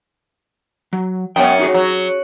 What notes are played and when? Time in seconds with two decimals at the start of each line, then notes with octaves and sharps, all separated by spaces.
0.93 F#3
1.36 F#2 B3 C#4 F#5 G5
1.59 D#4 F#4 G#4
1.74 F#3